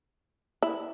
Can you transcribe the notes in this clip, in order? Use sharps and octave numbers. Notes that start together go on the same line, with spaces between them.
E4